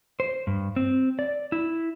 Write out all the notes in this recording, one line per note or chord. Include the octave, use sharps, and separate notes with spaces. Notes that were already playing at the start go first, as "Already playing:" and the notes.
C5
G2
C4
D5
E4